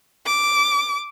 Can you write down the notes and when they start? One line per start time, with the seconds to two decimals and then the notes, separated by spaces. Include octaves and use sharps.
0.25 D6